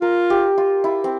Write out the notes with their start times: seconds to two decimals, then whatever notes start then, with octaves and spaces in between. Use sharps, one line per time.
0.02 F4 A#4
0.30 G4
0.58 F4
0.84 E4
1.04 C4